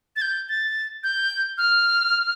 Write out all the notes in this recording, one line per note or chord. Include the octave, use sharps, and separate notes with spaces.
A6
G6
A6
G6
F6